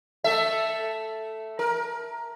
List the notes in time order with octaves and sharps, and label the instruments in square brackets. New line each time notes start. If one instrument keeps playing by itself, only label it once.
[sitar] A3 A4 E5
A#4